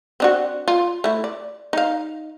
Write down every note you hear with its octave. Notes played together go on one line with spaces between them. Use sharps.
C4 D4 F#4
F4
A3 E4
D5
D#4 F5